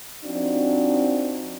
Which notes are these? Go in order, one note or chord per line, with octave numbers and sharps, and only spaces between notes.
F3 C4 D4 D#4 F#4